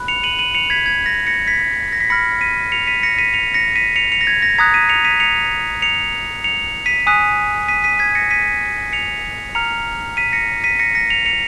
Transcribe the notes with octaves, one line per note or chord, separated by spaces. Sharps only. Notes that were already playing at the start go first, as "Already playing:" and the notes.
Already playing: B5 F#6
C#7 F7
D#7 F#7
D#7 F#7
C#7 F7
G#6 B6
G#6
A#6
A#6 C#7
G#6 B6
A#6
B6
B5 F6 A#6 C#7
B6 D#7
C#7 F7
B6 D#7
A#6 C#7
B6 D#7
C#7 F7
A#6 C#7
B6 D#7
C#7 F7
C#7 F7
A#6
G#6
A#6
A#5 D#6 F#6 G#6 B6
B6 D#7
C#7 F7
B6 D#7
C#7 F7
C#7 F7
C#7 F7
B6 D#7
G#5 D#6 F#6 B6 D#7
B6 D#7
B6 D#7
G#6 B6
A#6 C#7
B6 D#7
C#7 F7
A#5 F6 C#7 F7
B6 D#7
A#6 C#7
B6 D#7
A#6 C#7
A#6 C#7
C#7 F7
C#7 F7